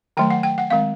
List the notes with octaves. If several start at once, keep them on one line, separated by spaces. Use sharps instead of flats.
D#3 F#3 A3 G5
F#5
G5
F#5
D#3 G#3 C4 F5